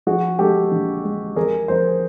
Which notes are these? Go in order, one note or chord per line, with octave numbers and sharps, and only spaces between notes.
F3 F#4 G#4
G#3 G4 A4
A#1
G#3
F2 G#4 A#4
F3 A#4 C5